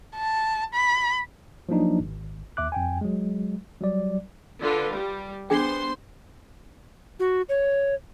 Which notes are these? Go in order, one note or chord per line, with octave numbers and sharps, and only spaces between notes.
A5
B5
F3 F#3 A#3 D4 D#4
G#1
D#2 E5 D6 F#6
F2 G5 G#5
F#3 G#3
F#3 G3 D5
D3 F4 B4
G3
B3 D4 G#4 C5 G5 C6
F#4
C#5